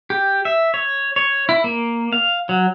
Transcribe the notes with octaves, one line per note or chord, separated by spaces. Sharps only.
G4
E5
C#5
C#5
E4
A#3
F5
F#3